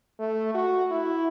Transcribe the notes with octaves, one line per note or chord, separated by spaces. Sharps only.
A3
F#4
E4